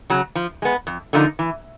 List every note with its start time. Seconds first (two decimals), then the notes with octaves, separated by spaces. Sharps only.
0.10 C#3 F#3
0.35 F3
0.62 G#3 B3
0.87 F2
1.13 D3 F3 A#3 D#4
1.39 E3